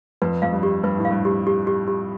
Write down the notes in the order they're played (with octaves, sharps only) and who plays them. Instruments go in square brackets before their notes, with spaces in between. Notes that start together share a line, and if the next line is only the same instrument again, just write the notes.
[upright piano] F2 [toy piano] B4
[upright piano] F2 [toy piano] F5
[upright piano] G2
[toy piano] G4
[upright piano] G2 [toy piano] B4
[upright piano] A2
[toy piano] F5
[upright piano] G2
[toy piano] G4
G4
G4
G4